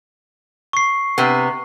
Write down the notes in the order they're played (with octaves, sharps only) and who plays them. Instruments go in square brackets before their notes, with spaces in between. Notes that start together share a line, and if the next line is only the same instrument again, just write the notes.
[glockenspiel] C#6 C7
[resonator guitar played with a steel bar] C3 B3